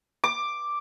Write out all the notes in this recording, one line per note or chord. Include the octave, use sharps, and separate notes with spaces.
D6